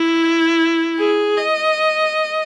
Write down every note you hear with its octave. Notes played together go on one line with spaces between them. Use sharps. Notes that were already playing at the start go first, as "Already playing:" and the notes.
Already playing: E4
G#4
D#5